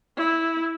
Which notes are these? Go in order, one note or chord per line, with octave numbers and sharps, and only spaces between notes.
E4